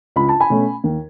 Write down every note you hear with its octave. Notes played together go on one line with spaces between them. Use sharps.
C#2 B5
A5
G#5 B5
B2 A3 C#4
D#2